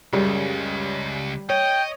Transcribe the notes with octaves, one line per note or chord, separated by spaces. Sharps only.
C#2 F#2 C#3 G3
C#5 D#5 G5